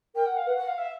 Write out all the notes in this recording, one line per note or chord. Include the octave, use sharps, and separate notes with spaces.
A#4 G5
F#5
F5
B4 F#5
F#5
F5
E5